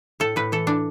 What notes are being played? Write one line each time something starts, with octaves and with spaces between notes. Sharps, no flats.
A2 A4
A2 B4
E3 A4
E3 D4